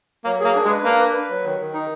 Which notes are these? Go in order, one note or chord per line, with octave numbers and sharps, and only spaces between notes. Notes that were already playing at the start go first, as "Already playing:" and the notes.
F#3 A#3
A#3 G#4
D4
G#3
B4
A#3 D4
B4
B4
F#3
D#3
D#3
D#4